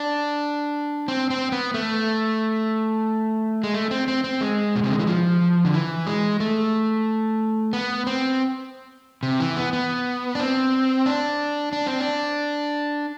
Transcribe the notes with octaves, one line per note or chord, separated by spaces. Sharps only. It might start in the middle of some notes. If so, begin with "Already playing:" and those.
Already playing: D4
C4
C4
B3
A3
G#3
A3
C4
C4
C4
G#3
B2
C3
D3
E3
F3
D3
E3
G#3
A3
B3
C4
C3
E3
B3
B3
D4
C4
D4
D4
C4
D4